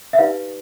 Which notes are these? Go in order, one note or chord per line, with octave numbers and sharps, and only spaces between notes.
E5
D#4 G4 B4 D5 F5